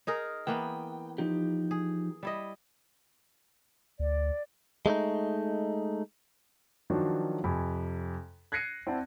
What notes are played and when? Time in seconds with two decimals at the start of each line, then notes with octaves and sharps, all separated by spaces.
0.07 D#4 G#4 A#4
0.47 E3 A#3 B3 G5
1.18 F3 D#4 G4
1.71 G#4
2.23 G3 E4 D#5
3.99 D2 D5
4.86 G#3 A3 C#4 D#4
6.90 D#3 F3 F#3 D4 F#4
7.44 F2 C3 G#5 B5
8.52 F#6 G#6 A#6 C7 C#7 D#7
8.87 C4 E4 D5 F#5 A5